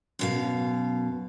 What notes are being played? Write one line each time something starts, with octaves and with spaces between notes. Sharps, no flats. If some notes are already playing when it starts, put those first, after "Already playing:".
F#2 B2 F5